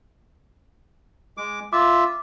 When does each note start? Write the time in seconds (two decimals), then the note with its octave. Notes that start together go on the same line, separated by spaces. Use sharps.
1.37 G#3 D6
1.73 F4 E5 D6